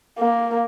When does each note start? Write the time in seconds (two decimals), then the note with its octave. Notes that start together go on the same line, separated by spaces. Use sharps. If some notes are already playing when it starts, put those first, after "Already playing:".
0.19 A#3